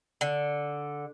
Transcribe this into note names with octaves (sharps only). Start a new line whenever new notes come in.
D3